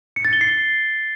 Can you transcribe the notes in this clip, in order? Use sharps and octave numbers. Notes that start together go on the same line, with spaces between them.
C#7
A6
G7
C7